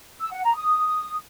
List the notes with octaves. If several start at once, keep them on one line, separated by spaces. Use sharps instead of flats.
E6
F#5
A#5
D#6